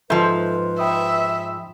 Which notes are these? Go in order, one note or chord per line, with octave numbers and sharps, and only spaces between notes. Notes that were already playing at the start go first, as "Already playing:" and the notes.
G#2 F3 A4 B4 E5 G6
E5 G5 B5 D#6